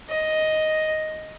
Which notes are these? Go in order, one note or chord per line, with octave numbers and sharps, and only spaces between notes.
D#5